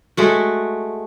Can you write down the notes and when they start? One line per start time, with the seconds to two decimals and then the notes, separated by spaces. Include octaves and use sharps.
0.17 G#3 A3 F#4